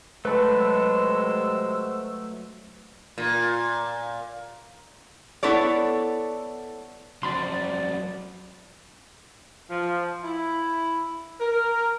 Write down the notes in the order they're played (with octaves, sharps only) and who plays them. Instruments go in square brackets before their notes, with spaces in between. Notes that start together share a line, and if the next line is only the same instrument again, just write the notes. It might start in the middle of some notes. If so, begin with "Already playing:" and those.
[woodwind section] C3 G#3 [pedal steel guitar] F#3 A3 [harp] B4 A5 [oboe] E6
[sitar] A#2
[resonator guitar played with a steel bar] B3 E4 A4 C#5 D5
[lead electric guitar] F2 F#3 [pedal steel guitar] D5 B5 C6
[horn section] F3
E4
A#4